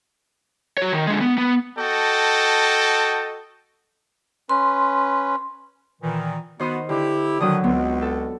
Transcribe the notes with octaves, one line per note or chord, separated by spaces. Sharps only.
F#4 C#5
D#3
D3 G#3
B3
B3
F#4 A4 D#5 G5 A5
C#4 B4 C6
A#2 D#3 E3
D#3 B3 F#4 C5 D#6
D3 E4 G4
D3 D#3 F3 F#3 D#6
C#2 B3 C4
A4